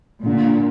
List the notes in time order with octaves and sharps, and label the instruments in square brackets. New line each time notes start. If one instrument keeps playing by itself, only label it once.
[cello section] A#2 [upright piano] D3